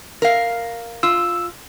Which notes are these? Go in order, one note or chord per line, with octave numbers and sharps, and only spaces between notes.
A#4 F5
F4 E6